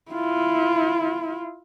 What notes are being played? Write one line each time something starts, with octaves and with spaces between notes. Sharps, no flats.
E4 F4